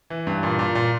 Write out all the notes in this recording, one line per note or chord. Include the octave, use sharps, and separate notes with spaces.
E3
G2
A#2
A#2
A#2